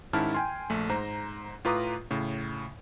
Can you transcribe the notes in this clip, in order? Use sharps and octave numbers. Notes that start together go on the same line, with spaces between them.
G#2 D#3 C#4 E4 A5 F6
G5 G#5 C6
A#1 A3
G#2 C5 A#5
A2 F4 B4 A#5 D6 D#6
A2 C#3